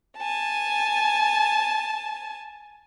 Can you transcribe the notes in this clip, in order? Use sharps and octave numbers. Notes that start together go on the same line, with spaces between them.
G#5 A5